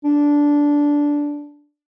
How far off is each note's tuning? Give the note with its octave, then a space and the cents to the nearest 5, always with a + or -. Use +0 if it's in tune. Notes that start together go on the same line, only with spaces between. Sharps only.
D4 -10